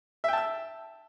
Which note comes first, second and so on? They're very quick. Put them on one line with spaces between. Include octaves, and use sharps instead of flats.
E5 G5 A5 E6